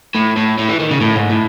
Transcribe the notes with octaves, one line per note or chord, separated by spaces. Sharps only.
A2
A2
A2
E3
D#3
C#3
A2
G#2
A2